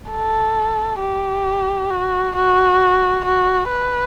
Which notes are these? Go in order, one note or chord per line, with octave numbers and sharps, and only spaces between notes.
A4
G4
F#4
F#4
F#4
B4